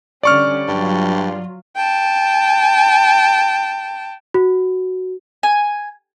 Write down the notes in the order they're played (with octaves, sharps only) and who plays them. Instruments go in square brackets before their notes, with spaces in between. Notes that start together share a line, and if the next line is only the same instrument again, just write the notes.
[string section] D3 G3 C#4 [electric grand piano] D5 C#6 F6
[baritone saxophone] G2 [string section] F#3 F4
[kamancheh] G5 A5
[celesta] F#4
[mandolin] G#5